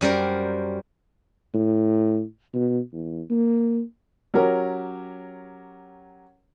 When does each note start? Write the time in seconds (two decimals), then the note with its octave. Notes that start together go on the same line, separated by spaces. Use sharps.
0.01 F#2 G3 A#4 C5
1.54 A2
2.54 B2
2.93 E2
3.30 A#3
4.34 F#3 C#4 G4 A#4